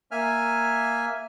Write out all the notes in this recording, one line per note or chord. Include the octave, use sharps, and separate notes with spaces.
A#3 E5 G#5 F6